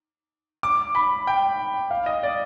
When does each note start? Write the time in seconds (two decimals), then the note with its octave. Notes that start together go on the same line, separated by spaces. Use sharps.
0.63 D6
0.95 B5
1.27 G5
1.91 F5
2.06 D#5
2.23 D5